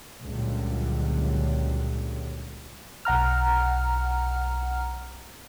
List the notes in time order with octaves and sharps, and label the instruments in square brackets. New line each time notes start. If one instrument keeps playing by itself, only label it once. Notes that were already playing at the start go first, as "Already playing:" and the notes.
[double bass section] C#2 A#2 D3 F#3 G3
[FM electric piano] B1 F#5 A#5 F6